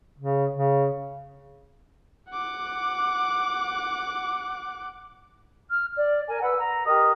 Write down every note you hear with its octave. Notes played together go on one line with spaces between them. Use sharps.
C#3
C#3
F#5 D6
F6
D5
A#4 G#5
B4 F#5 E6
A#5
G4 A#4 D#5 D#6